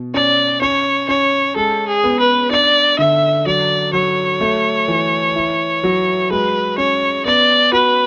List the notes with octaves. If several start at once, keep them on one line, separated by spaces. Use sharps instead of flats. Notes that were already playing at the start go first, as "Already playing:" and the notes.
Already playing: B2
C#4 D5
C#4 C#5
C#4 C#5
G#3 A4
G#4
B3
B4
D4 D5
D3 E5
F#3 D5
F#3 C#5
A3
E3
E4
F#3
G#3 B4
C#4 C#5
B3 D5
F#4 B4